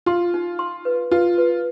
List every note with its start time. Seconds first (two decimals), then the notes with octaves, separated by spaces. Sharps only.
0.06 F4 C6
0.34 D#4
0.59 C6
0.85 B4
1.11 F4 B4
1.38 B4